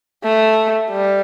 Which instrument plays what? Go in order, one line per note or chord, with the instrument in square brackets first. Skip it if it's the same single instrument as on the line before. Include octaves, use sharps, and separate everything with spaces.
[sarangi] A3
G3